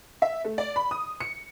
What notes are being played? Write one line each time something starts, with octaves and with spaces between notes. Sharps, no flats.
E5
A3
D5
B5
D#6
C#7